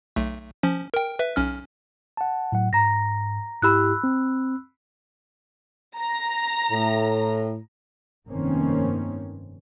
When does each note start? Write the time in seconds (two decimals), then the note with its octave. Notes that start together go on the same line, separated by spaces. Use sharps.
0.16 B1 A3
0.63 F3 C#4
0.94 A#4 G5
1.19 B4 E5
1.36 B1 C#4 F6
2.17 F#5 A5
2.52 A2 F#3 F#5
2.73 G#2 A#5 A#6
3.62 G#2 E4 G4 B5 E6 F#6
4.04 C4
5.99 A#5
6.71 A2
8.27 F1 G2 D#3 A#3 C4 C#4